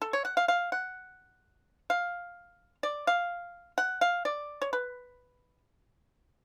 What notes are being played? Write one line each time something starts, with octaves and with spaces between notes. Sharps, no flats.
A4
C#5
F#5
F5
F5
F#5
F5
D5
F5
F#5
F5
D5
C#5
B4